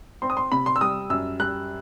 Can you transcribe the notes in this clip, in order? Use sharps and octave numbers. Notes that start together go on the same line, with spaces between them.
C4 C6
D#6
C6
C3 B5
C6
E6
G3 D#6
F#2 E6
G3 F#6